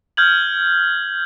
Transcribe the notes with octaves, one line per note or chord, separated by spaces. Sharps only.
F6 G6 G#6 F#7